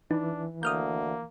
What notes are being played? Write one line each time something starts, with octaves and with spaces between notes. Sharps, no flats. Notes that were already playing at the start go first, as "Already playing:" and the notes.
E3 D4 D#4
D2 A#3 D#6 F6 G6